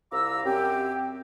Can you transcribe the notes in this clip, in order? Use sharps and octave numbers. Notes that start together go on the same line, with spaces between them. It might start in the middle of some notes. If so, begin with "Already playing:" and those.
C2 F4 A#5 D6 E6
F#2 C4 G4